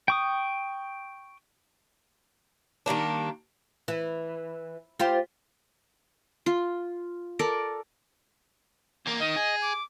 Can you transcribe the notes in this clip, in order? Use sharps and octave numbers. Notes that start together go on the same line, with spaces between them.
G5 C#6 D#6
D#3 G3 A#3 D4
E3
F4 G4 C5
F4
A4 A#4 D5
E2 A#3
D#3 D#5
G#4
D6